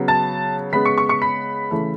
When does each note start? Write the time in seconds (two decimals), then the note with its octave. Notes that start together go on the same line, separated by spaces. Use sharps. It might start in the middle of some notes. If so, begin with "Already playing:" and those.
Already playing: C#3 F#3 B3
0.08 A5 A6
0.73 C#3 G#3 B3 B5 B6
0.85 C#6 C#7
0.98 C#6 C#7
1.09 C#6 C#7
1.22 B5 B6
1.71 C#3 E3 A3